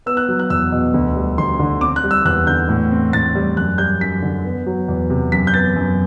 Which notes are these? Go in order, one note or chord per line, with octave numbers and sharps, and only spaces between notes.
B3 E6
F#6
F#3
F#6
E2 E6
B2
D2
G3
D2 C6
D3
C4 D6
F#6
G3
E6
E2 F#6
D3 G6
A2
C4
A2 A6
G3
F#2 F#6
G3 G6
F#2 B6
D3
B3
F#3
E2
C3
F#2 B6
G6
B3 A6
F#2